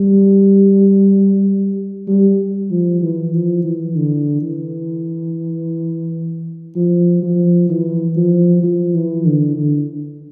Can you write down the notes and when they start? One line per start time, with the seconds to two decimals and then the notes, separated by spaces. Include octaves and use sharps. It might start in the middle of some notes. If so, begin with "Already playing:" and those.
Already playing: G3
2.08 G3
2.71 F3
3.02 E3
3.33 F3
3.64 E3
3.95 D3
4.42 E3
6.76 F3
7.23 F3
7.69 E3
8.16 F3
8.63 F3
8.94 E3
9.25 D3
9.56 D3